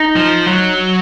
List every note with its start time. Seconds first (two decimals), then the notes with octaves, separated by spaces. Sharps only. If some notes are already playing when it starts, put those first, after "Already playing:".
Already playing: D#4
0.16 F3
0.47 F#3